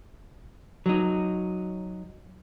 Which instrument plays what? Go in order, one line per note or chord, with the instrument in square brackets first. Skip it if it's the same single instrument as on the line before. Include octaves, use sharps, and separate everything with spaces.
[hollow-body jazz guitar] F#3 D#4